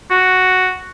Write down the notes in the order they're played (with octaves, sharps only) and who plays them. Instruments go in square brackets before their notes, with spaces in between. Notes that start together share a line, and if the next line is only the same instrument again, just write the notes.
[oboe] F#4